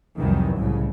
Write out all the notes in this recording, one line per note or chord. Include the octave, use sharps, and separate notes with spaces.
C2 F2 D#3 E3 F#3
C2 A2 C#3